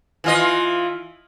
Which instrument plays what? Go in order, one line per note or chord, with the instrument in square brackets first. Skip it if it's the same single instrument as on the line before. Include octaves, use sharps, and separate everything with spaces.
[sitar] E3 F4 D#5